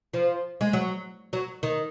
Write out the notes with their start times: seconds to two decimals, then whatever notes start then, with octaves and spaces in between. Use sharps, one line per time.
0.14 F3
0.61 G#3
0.73 F#3
1.33 F#3
1.63 D#3